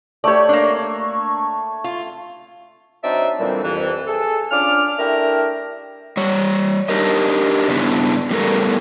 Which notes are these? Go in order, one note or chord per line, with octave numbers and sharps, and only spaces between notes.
A3 G4 C#5 D5
A#3 D4
F4
F#3 C4 D4 D#4 D5 E5
A#2 D3 E3 F3 G3 C4
C2 F2 E3
G#4 A4
C#4 D4 F4 D6 F6
A3 D4 E4 G4 A#4
G3 C#5
D4 D#4 G4 A#4 D#5
G2 C#3 B3 D4 E4
A2 G3 B3 A4 A#4